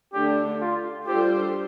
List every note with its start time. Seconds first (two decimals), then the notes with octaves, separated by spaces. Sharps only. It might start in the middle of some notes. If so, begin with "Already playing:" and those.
0.14 D3 A3 D4 G4
0.61 F4
1.07 G3 D4 F4 G4 A4 C5